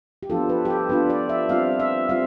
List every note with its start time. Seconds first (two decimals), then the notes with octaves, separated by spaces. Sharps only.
0.23 G4
0.30 F3 B3 D4 F4 A4
0.49 B4
0.65 G4
0.70 A4
0.89 F3 B3 D4 F4 B4
1.10 D5
1.29 E5
1.49 G3 C4 F4 F5
1.79 E5
2.09 G3 C4 F4 F5